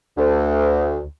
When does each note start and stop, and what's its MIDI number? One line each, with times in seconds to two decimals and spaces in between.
0.17 1.03 38